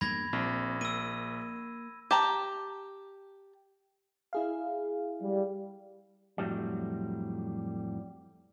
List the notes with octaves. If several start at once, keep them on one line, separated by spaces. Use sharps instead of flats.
E2 G2 A#3 B5 G#6 A#6
A#1 C4
A#3 E6 D#7
G4 A5 A#5
E4 G#4 F5
G3
F2 A2 F#3 G3